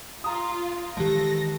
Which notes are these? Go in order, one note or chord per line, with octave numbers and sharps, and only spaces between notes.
F4 A#5 D#6
D#3 E3 G#3 G4 A4 A5 A#6